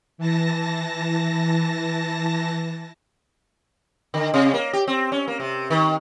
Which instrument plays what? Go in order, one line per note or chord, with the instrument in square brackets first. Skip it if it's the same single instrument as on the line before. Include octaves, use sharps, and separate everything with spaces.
[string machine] E3 A5 A#6
[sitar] D3
C3
A#3
G4
C4
C#4
A#3
C3
D#3